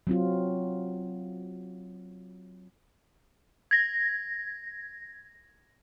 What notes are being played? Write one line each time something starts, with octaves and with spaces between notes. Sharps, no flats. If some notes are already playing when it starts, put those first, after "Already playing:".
F#3 C4 F4
G#6 A#6